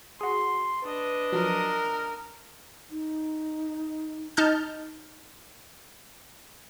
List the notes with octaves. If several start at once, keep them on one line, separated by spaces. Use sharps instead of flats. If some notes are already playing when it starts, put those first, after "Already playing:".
F#4 G#4 C6
D4 B4 D#5
F3 F#3 A#4
D#4
D#4 A5 F6 G6